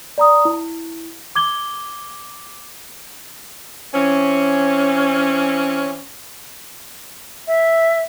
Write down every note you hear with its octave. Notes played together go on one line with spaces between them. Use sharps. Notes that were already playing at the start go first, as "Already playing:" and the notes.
D5 A#5 D#6
E4
D6 G#6 G7
E3 C4 C#4
E5